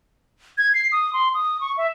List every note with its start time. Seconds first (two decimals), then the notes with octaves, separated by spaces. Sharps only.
0.58 G#6
0.74 C7
0.92 D#6
1.13 C6
1.34 D#6
1.61 C#6
1.78 E5